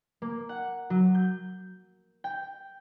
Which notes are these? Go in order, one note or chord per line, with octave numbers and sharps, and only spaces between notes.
A#3
F#5
F#3
G6
G5